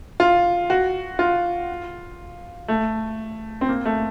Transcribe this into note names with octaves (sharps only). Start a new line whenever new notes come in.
F4
F#4
F4
A3
C4
A#3
A3